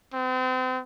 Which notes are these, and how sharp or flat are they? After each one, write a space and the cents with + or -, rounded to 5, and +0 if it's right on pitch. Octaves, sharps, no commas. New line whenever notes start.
C4 -35